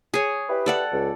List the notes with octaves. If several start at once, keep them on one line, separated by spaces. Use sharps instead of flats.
G#4 C#5
E4 G4 B4
A4 D5 F#5
C#2